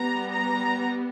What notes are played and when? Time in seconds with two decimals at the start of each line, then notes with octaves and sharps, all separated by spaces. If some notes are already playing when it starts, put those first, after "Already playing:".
Already playing: G3 B3 A#5
0.30 A#5